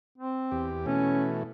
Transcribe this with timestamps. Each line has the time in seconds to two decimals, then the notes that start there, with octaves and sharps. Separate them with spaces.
0.18 C4
0.51 E2 G4
0.86 B2 E3 A3 C#4